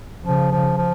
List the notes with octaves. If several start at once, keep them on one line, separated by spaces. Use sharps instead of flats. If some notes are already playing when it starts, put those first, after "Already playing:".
C#3 F3
F3
F3